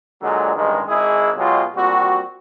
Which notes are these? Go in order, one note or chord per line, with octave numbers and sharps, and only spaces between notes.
A#2 D3 F#3 G#3
A1 G2 D#3 G#3
G#1 G#3 E4 G#4
B2 F#3 G#3 F4 G4
A#2 G3 C4 F#4